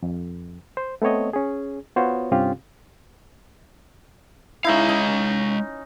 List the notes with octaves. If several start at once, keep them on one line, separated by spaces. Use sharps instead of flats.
F2
C5
A3 B3 C4 C#5 D#5
C#4 G#4
B3 F4 F#4 C5 C#5
G2 C3 C4 C#4 F4 G4
G#3 C#4 D#4 E4 F5
D#4